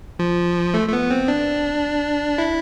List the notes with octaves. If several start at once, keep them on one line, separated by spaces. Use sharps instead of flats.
F3
A3
A3
B3
C4
D4
E4